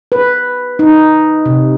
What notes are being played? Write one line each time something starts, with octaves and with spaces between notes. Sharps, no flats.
B4
D#4
C3